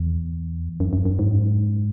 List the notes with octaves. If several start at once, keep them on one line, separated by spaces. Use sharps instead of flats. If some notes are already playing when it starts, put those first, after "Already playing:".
Already playing: E2
F#2
F#2
F#2
G#2